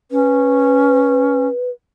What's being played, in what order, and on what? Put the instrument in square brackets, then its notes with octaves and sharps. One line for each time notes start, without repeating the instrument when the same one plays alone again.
[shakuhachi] C#4 [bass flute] B4